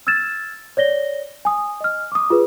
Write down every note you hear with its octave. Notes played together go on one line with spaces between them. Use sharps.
E6 F6 G#6 A6 E7
C#5 D5 A#6 G7
G#5 D#6
D#5 F6
D6 D#6
F4 G#4 B4